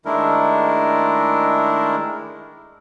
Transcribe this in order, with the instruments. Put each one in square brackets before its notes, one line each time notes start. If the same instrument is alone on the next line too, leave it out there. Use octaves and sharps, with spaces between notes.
[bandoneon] D#3 G#3 A3 D4 E4 A#4